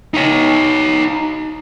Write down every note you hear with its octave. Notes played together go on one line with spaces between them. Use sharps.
D#4 C#5